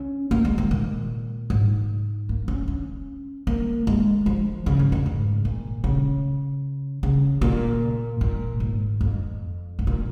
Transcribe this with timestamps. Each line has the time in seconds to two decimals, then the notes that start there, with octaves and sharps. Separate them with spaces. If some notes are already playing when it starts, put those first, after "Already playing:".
Already playing: C#4
0.31 A#3
0.45 G#3
0.58 D#3
0.71 A#2
1.50 G#2
2.29 A#3
2.48 C#4
2.68 C#4
3.47 A#3
3.87 G#3
4.26 F3
4.66 C#3
4.79 G#2
4.92 F2
5.06 G#2
5.45 A#2
5.84 C#3
7.03 C#3
7.42 A#2
8.21 A#2
8.60 G#2
9.01 F2
9.79 G#2
9.87 A#2